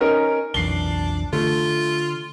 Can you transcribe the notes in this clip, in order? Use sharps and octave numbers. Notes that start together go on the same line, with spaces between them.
C#4 D#4 A#4
B1 F2 E3 D4 C7 G7
D3 A3 F4